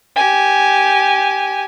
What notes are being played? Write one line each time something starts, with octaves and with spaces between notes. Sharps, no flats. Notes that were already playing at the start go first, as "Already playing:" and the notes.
G4 G#5